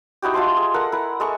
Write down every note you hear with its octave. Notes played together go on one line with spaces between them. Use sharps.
D#4 E4 F#4 G4
F4 E5 A5 C6
G#4
A4 A#4 F#5
E4 A#4 F#5
G#3 A4 C#6